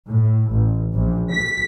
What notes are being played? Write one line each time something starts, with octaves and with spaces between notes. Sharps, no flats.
A2
A1
A#1
B6